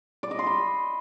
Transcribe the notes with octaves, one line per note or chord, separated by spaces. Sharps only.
D5
D#5
C6
B5